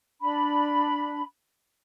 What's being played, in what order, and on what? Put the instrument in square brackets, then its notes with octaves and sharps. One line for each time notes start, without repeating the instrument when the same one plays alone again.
[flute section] D4 B5